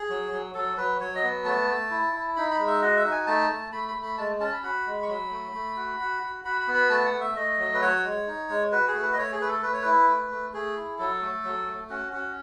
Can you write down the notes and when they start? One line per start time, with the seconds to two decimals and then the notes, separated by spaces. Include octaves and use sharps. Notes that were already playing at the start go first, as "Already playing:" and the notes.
Already playing: G#4
0.10 F#3
0.32 F#3
0.54 F#3 A4
0.77 F#3 B4
1.00 F#3 C#5
1.15 D#5
1.23 B3
1.45 A3 A5
1.68 A3
1.91 E4
2.13 E4
2.36 D#4 B5
2.51 B5
2.59 G#3
2.67 E5
2.82 F#4 D#5
2.96 E5
3.05 D#4
3.12 G#5
3.27 A3 A5
3.49 A3
3.72 A3 B5
3.88 B5
3.95 A3
4.02 B5
4.18 G#3 A5
4.40 C#4 A5
4.52 B5
4.63 F#4 B5
4.86 G#3
5.03 C#6
5.08 F#3 B5
5.31 A3
5.54 A3
5.76 F#4
6.00 F#4
6.23 F#4
6.45 F#4 B5
6.61 B5
6.67 B3
6.75 B5
6.90 A3 A5
7.06 F#5
7.13 A3
7.20 E5
7.36 A3 D#5
7.59 F#3
7.74 B4
7.82 F#4 C#5
8.04 G#3
8.27 D#4
8.49 G#3
8.72 F#4 B4
8.88 G#4
8.94 A3
9.02 B4
9.13 D#5
9.17 A3 C#5
9.32 G#4
9.40 A3 B4
9.48 A4
9.62 A3 B4
9.73 C#5
9.82 E4 B4
10.08 A3
10.31 A3
10.53 A3 G#4
10.77 E4
10.98 F#3 A4
11.21 A3
11.44 F#3
11.67 A3
11.89 C#4 F#4
12.12 C#4 F#4